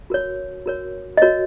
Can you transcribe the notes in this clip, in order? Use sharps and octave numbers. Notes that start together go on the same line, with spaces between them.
F#4 A#4 C#5
F#4 A#4 C#5
D#5
F#4 A#4 C#5